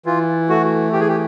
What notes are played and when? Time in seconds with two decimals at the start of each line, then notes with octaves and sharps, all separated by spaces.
0.06 E3 F4
0.49 A3 F#4
0.93 E3 G4
1.00 G#4
1.09 G4